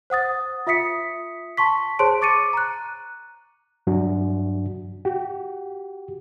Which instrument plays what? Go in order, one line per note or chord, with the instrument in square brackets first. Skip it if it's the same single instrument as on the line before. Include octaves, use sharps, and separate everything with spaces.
[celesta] C5 F#5 D#6 A6
F4 E5 D#6 B6 C#7
A5 C6 C#6 B6
G#4 C5 C#5 A5 C6 D7
C#6 D6 A6 C#7 D#7
A#5 F#6
[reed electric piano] G2 F#3 D4 F#4
F#4 G4